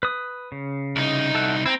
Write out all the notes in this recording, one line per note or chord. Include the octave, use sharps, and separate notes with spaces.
B4 D#6
C#3
C2 D#4
A4 E5 F#5
C4 E4 G5 A#5